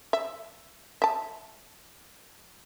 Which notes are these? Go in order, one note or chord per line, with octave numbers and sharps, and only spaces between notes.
E5
E5 A5